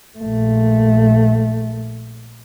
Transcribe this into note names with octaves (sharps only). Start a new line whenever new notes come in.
A#1 A3